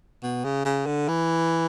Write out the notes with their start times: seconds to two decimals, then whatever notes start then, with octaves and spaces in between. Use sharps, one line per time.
0.23 B2
0.44 C#3
0.65 C#3
0.86 D3
1.08 E3